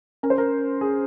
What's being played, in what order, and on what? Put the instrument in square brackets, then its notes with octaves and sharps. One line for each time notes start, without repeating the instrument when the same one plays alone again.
[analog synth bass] C#4 [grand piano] A#4
[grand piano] C5
A#4
G#4